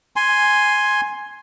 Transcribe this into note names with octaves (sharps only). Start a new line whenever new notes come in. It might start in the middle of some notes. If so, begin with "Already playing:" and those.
G#5 C6